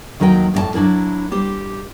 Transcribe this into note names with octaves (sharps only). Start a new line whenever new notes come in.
D#2 D#3 F#3 A#4 C#5 G5
F2 A2 G4 D5 A5
F#3 D4 E4 A#4
G3 G4 C5